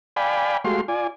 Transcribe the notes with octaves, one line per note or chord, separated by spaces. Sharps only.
D5 F5 G5 G#5 B5
G#3 A3 F#4 G4 F5 C6
F4 D5 G#5